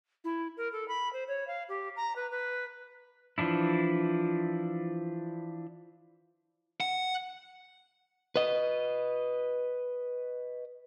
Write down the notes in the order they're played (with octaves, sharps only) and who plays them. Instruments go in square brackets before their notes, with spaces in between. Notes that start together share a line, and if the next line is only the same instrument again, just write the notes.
[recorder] E4
A#4
A4
B5
C5
C#5
F5
G4
A#5
B4
B4
[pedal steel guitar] E3 F3 D4 E4
[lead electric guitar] F#5
B4 D#5